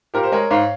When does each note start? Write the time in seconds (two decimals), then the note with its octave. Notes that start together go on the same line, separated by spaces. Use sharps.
0.14 A#2 G4 A#4
0.23 C5
0.32 G#3 A#4 C#5
0.51 G#2 C#5 F5